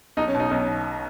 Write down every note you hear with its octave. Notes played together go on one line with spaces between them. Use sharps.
B1 D#4
C#4
B2
D#4
B1 C#4
B2